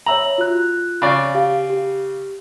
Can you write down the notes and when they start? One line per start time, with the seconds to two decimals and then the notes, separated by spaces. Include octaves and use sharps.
0.06 C#5 E5 A#5 E6 F#7
0.38 F4 F#4 F#6
1.02 C#3 D5
1.35 G4 F5
1.70 G4